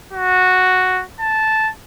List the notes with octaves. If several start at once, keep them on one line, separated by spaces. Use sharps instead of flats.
F#4
A5